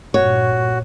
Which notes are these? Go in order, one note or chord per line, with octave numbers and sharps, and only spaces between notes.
G2 A#2 F#4 C#5